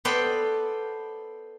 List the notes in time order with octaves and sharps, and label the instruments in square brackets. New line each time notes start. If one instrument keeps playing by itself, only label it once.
[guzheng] B3 A4 C5 D5 G5 B5